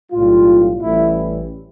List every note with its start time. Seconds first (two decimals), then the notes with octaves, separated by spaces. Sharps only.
0.11 B1 A2 G3 F4
0.81 A1 A2 E3 G3 E4